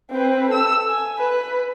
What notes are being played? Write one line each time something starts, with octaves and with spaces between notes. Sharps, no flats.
C4 B4
A4 E6
G#5
B4